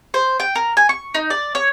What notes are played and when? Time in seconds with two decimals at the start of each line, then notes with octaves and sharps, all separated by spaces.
0.14 C5
0.40 G5
0.55 A#4
0.77 G#5
0.89 C#6
1.15 D#4
1.30 D5
1.55 C#5